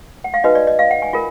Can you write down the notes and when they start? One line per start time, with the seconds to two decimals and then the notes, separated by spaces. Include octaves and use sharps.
0.24 F#5
0.34 F5
0.44 D#4 F#4 B4 D#5
0.55 D5
0.67 D#5
0.79 F5
0.91 F#5
1.02 G#5
1.13 F4 A#4